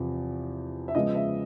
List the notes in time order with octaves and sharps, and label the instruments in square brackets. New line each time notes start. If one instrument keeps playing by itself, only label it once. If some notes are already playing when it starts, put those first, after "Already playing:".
Already playing: [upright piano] E2 C3 F3
E5
C#3 F3 G#3 B3 D#5
E5